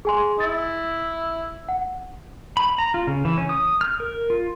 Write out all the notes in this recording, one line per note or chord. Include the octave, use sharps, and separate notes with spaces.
G#4 G#5 C6
E4 A6
F#5
B5
A#5
F4
C#3
E3
C#4
D#6
F6
A#4
F4